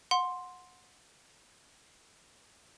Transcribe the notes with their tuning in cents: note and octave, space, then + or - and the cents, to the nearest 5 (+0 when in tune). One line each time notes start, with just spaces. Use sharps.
F#5 -25 C6 +0